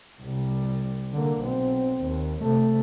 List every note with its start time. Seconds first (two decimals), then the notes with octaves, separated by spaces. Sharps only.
0.21 C2 G3
1.13 D3 A#3
1.42 B1 C4
2.01 D#2
2.40 C3 A3